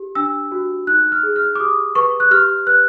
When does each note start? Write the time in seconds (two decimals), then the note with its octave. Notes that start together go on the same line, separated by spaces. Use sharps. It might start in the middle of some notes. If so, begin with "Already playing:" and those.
Already playing: G4
0.15 D4 E6
0.52 F#4
0.87 D#4 F#6
1.12 F6
1.23 G#4
1.36 F6
1.55 D6
1.60 G4 D#6
1.95 B4 C#6
2.20 F#6
2.31 G4 F6
2.67 B4 F#6